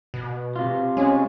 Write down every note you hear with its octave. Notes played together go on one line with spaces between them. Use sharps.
B2
C3 F4
G#3 C#4